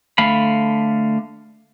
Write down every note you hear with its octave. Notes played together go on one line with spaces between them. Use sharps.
D3 A3 F5 B5